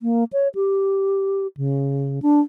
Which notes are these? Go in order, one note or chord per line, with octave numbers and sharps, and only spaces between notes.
A#3
C#5
G4
C#3
D4